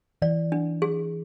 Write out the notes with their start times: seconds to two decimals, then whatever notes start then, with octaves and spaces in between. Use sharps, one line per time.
0.22 E3 D5
0.52 D4
0.82 G#4